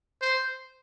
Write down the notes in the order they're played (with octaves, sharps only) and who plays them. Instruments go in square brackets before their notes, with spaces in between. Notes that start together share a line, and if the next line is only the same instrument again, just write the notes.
[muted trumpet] C5